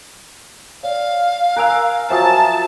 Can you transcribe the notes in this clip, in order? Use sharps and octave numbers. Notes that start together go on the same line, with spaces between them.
C#5 D5 F5
A#4 G#5 E6 F#6 D7 F7
F3 F#3 C#5 E5 G#5 A5 D#6